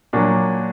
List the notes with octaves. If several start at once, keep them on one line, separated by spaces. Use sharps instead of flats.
A#2 F#3 D4 F#4